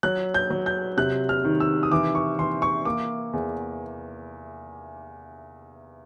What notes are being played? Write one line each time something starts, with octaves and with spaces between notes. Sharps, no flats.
F#3 F#6
G6
F#3
G6
C3 F#6
F6
D#3
E6
D#6
E3 D6
C#6
E3 C6
C#6
A#3 D6
E2